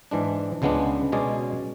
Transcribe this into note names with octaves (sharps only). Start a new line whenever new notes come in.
G#2 E3 G#3 D4
C#2 C#3 G#3 B3 D4
B2 G#3 C#4 G#4 D5